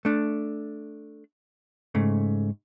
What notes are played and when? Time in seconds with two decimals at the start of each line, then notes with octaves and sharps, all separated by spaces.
0.05 A3 D4
1.95 G#2 C#3 A3